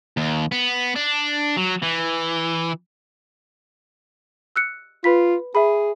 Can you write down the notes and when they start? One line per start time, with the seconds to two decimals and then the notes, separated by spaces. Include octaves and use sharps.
0.17 D#2
0.52 B3
0.96 D4
1.57 F#3
1.82 E3
4.56 E6 F#6 C#7
5.04 F4 B4 B5 B6
5.55 G#4 E5 B5